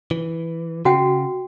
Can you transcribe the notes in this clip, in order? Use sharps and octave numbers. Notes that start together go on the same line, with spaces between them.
E3
C#3 F#4 F#5 G5